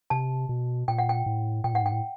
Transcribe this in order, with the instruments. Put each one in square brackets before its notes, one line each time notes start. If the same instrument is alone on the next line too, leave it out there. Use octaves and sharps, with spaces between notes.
[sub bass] C3 [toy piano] A5
[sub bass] B2
[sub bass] A#2 [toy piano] G5
[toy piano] F#5
G5
[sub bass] A2
[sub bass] A#2 [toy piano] G5
[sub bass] A2 [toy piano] F#5
[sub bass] G#2 [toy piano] G5
[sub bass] A2